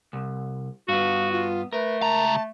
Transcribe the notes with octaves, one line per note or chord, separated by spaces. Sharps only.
C2
G2 B3 F#4 F5
F4
A3 A#4 B4
C#2 A5 A#5